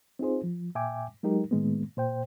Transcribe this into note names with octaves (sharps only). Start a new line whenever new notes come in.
C4 D#4 F4 G#4 C5
F3
A#2 E5 G5 G#5 D6
F#3 G#3 D#4 G4 A#4
A2 D#3 G#3 A#3 B3
A#2 C5 G5